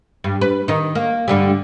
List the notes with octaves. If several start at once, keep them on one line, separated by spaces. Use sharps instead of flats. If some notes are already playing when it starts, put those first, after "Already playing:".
G2
B4
D#3 D#4
A#3
G2 D3 G3